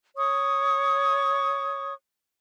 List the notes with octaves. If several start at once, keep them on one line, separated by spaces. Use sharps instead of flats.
C#5 C#6 D#6